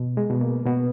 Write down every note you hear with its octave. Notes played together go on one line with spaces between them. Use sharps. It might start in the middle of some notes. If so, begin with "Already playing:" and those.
Already playing: B2
G#3
B2
A#3
B2 B3